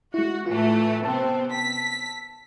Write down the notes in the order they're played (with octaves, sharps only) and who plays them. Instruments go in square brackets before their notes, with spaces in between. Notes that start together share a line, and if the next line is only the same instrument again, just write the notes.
[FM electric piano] G#3 E4 [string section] F#4
[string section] A2 E3 A3 [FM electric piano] F4
[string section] C3 B3 C4 [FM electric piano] A5 E6
[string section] B6